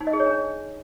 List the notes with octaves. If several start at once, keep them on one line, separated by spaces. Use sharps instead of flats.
D#4
D#5
G#4
C#5
D4